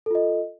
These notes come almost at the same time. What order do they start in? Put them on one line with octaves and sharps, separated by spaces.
A4 F4 D#5